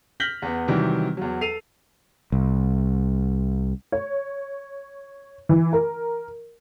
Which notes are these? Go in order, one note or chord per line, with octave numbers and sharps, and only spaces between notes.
F6 G6 A#6 B6 F#7 G7
E2 B3
C3 D#3 E3 F#3 G3
E2 F#3
A4 C7 D#7 F7
C2
C#5
E3
A#4